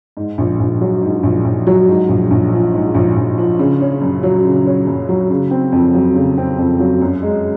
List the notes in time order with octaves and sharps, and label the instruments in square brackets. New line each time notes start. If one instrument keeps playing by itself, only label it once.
[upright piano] G#2
A#1
A#1
F#3
G#2
A#1
A#1
F#3
G#2
A#1
A#1
F3
G#2
A#1
A#1
F3
C#3
C#4
F#2
F#3
C#3
C#4
F#2
F#3
C#3
C4
F2
F#3
C#3
C4
F2
F#3
F#2
G#3